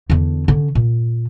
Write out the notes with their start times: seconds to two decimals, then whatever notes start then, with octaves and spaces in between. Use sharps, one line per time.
0.10 E2 D3
0.48 D3 C#4
0.75 A#2